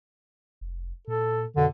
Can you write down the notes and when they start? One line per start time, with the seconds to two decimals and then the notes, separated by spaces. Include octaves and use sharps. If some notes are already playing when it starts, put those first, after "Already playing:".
0.61 F1
1.08 A#2 A4
1.56 F2 B2 D3